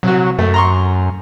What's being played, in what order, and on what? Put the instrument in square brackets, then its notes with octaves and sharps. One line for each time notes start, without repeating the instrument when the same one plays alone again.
[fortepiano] C2 F#4 [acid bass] F#3
[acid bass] F#2 [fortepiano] A3
[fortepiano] A#5 C6 C#6